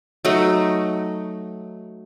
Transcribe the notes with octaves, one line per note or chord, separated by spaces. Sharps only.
F#3 A3 D#4